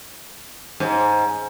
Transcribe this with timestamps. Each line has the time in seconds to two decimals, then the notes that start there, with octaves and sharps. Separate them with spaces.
0.80 G#2